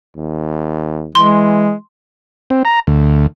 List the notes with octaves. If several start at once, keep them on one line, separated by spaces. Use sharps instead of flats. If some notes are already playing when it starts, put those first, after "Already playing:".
D#2
E3 G#3 C6
C4
A#5
D2